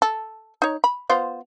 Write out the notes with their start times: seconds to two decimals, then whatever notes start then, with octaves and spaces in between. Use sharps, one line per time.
0.02 A4
0.62 D#4 C#5
0.84 B5
1.09 B3 F4 C5